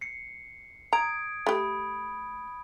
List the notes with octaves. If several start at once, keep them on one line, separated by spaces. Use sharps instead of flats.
C7 C#7
A#5 D#6 G#6 D7
A3 G4 B5 D#6